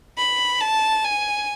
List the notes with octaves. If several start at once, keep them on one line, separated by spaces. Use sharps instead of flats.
B5
A5
G#5